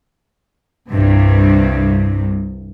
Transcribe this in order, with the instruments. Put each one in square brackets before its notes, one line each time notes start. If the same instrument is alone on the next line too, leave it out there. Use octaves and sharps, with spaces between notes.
[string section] C2 G2 C3